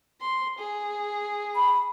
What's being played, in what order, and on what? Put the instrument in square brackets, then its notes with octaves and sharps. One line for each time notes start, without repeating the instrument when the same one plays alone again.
[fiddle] C6
G#4
[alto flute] B5